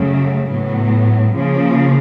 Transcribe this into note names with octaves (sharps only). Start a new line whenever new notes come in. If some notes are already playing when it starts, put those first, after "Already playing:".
Already playing: F#2 C#3 F#3 A3
A2 F#3 B3
C#3 F3 A#3